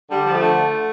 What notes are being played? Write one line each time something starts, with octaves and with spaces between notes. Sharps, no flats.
D3 G3
F3
A3
D3